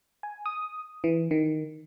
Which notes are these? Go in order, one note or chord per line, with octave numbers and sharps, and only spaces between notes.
G#5
D#6
E3
D#3